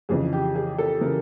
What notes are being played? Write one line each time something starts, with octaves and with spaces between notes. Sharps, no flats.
F2 C#3 E3 G#4
G4
G#4
A4
C#3 E3 A#4